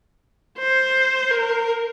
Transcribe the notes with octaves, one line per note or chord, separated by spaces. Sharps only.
C5
A#4